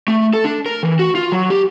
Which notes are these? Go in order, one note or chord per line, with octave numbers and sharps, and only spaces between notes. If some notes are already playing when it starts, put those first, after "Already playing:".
A3
A4
D4
A#4
E3
F#4
F4
F#3
G4